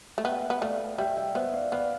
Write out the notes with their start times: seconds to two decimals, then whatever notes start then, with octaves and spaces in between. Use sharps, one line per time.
0.18 A3
0.25 B3 E5 G5
0.50 B3
0.61 A3 D5 F5
0.98 G3 E5 G5
1.17 E5 G5
1.35 B3 C5 E5
1.54 D5 F5
1.72 B3 D5 F5